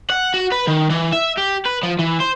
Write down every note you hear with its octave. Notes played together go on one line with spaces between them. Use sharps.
F#5
F#4
B4
D#3
E3
E5
G4
B4
F3
E3
C5